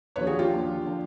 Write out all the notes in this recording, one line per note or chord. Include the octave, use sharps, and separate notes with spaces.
D#2 D3 F3 B4 C#5
F#4 G#4
F4 G4
D#2 D3 F3
D3 F3